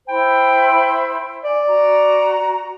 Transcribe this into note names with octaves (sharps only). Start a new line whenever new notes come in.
E4 C5 G5 B5
D5 G#5
F#4 A#5